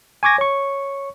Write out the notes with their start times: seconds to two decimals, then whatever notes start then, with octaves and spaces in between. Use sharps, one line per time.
0.23 G#5 C#6 D6 G#6 A#6
0.38 C#5 C#6